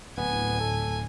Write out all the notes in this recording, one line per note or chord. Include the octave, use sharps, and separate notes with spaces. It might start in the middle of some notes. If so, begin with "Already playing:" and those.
D1 D2 A2 B3 G#5
A4